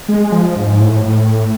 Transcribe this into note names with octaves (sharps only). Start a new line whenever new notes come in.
G#3
F3
G#2
A2